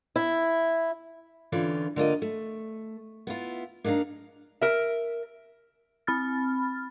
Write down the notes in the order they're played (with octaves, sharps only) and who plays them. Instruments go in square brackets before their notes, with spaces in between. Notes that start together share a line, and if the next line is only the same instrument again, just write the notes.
[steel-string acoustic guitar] E4
D3 E3 C#4 F4
D3 A#3 F4 D#5
A3
B3 E4 F4
A#3 D4 D#4 F5 A#5
[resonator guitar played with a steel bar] A#4 E5
[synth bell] C4 B5 F6 A6